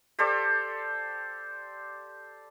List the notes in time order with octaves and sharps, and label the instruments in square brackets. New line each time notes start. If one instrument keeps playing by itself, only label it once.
[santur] G4 A4 C5 D5